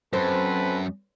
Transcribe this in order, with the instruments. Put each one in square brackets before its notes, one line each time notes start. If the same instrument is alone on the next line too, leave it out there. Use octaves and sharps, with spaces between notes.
[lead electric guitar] F#2 [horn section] C4 A4 B4 [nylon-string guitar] C5